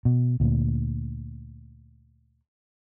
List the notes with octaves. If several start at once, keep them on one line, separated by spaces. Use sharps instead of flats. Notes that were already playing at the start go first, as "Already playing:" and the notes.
B2
D2 A#2